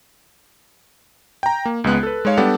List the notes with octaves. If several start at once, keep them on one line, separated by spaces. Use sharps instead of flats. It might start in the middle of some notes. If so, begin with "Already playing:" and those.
G5 A#5
A#3
C#2 G#3 B3 F#6
A4 B4
G#3 D#4 C#5 F5
G3 B3 D4 G4 A4 F#5